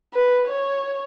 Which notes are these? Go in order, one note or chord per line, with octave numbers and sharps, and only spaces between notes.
B4
C#5